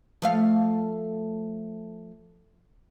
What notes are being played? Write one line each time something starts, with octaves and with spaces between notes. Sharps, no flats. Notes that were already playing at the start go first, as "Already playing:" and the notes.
F3 A3 F5